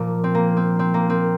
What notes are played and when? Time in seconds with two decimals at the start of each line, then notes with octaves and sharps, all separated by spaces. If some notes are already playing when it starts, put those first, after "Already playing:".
Already playing: A#2 F3 A#3
0.24 C4
0.35 A#3
0.57 C4
0.79 C4
0.94 A#3
1.10 C4